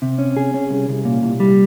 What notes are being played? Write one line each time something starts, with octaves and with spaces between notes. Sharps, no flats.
C3
C#4
G#4
C#4
C2
C2
A#2
C2
G3